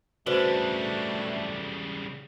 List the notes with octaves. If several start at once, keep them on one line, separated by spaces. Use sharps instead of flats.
C#3 G3 A3 D4 F#4 B4 C5